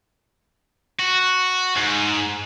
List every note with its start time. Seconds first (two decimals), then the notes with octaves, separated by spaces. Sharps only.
1.00 F#4
1.76 G#2